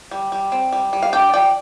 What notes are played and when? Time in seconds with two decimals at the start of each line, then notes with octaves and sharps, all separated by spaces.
0.11 G3
0.32 G3
0.52 C4
0.73 G3
0.93 G3
1.03 F5
1.13 D4 D5 G5
1.33 F3 D5 G5